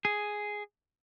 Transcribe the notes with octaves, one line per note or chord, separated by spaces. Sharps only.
G#4